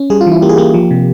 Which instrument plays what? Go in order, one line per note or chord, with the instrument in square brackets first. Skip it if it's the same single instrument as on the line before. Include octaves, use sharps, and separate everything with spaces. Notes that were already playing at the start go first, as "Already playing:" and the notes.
Already playing: [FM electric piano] C#4
G3 G#4
F4
E3
E4
A#3 G4
G#4
A#3 G4
F3
C3